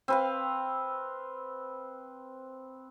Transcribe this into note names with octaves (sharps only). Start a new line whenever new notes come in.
C4 B4 F5